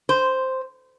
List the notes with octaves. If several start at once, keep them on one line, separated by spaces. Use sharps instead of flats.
C5